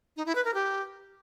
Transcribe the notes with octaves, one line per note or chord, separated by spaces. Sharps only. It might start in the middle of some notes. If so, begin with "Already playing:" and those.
D#4
E4
B4
A#4
G4